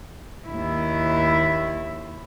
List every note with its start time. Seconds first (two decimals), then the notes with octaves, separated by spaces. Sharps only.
0.48 D#2 E4